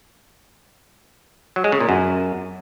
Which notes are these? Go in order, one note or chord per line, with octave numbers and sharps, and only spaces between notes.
F#3
G#3
C#3
A#2
F#2